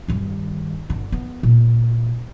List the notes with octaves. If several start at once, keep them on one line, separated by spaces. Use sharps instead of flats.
G2 D#3
G1 D3
B3
A#2